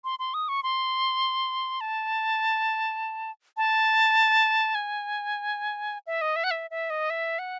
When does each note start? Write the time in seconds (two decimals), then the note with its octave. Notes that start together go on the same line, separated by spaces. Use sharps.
0.04 C6
0.19 C6
0.34 D#6
0.48 C#6
0.63 C6
1.81 A5
3.57 A5
4.75 G#5
6.07 E5
6.21 D#5
6.36 E5
6.44 F#5
6.51 E5
6.70 E5
6.90 D#5
7.10 E5
7.39 F#5